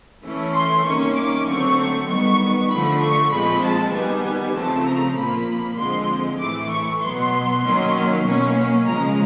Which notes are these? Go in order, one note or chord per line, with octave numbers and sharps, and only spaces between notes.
E3 A3 C#4
C6
C3 D#3 G3 A#3 C#4 C#6
D6
D3 F#3 A3 C4 C#6
D#3 G3 B3 C#6
D3 F3 A3 B5
C#6
A#2 F3 G#3 C4 B5
A5
D#3 G3 B3 G#5
C#3 F3 A3 C4 A5
A#5
A#2 F3 A#3 B5
D3 F3 G#3 C4 C6
A2 E3 A3 D6
C#6
B2 F#3 B3 C6
D#3 F#3 A#3 C#4
B2 F#3 A#3 C#4
C#3 F3 G#3 A#5